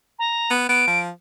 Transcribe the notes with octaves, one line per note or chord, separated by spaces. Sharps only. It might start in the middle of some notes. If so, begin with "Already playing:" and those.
A#5
B3
B3 D7
F3